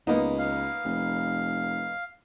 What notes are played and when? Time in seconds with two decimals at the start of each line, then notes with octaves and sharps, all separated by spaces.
0.07 C#2 A#3 B3 D#4
0.39 F5
0.85 F1